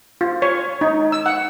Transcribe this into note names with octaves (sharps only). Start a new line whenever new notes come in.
F4
C#5
D#4
E6
F#5